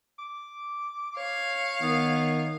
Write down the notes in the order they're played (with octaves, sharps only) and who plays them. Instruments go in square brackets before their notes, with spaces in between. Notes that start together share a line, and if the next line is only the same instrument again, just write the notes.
[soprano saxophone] D6
[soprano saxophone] C#5 [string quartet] F5
[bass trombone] D#3 [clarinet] B3